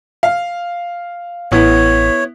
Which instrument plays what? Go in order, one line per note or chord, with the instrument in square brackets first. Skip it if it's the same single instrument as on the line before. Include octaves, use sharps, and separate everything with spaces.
[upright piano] F5
[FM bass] A1 [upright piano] B3 E4 [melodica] C#5